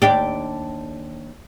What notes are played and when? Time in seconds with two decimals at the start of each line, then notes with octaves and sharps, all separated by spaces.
0.02 D#2 D4 G4